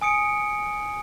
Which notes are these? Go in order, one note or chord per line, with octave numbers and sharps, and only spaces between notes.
G#5 D#6 C#7 D7